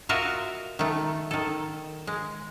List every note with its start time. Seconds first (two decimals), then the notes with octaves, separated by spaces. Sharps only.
0.09 F4 F#4 A#4 D#5 E5
0.79 D#3 A3
1.31 D#3 A4
2.07 G#3